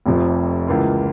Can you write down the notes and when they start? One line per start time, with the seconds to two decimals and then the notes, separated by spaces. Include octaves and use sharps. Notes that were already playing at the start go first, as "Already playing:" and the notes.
0.06 F1 F2 C3 F3
0.68 C#2 C#3 E3 A#3 F4